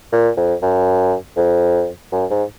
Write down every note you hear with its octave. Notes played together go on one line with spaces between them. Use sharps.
A#2
F2
F#2
F2
F#2
G#2